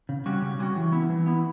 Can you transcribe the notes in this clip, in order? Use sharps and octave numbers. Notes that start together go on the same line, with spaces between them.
C#3
G3 C#4 F#4
C#3
G3 C#4 F#4
E3
B3 E4
E3
B3 E4